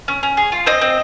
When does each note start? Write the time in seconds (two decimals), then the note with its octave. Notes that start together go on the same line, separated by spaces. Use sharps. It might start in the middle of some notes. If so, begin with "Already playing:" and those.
0.08 C#4
0.23 C#4
0.37 G#4
0.52 F4
0.66 C4 D#5
0.81 C4